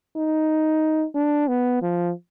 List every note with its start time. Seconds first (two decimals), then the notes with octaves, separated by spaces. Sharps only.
0.16 D#4
1.15 D4
1.48 B3
1.82 F3